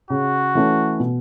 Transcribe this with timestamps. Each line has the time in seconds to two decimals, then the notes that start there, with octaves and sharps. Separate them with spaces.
0.10 C#3 F#4
0.55 E3 A3 C#4
1.00 B2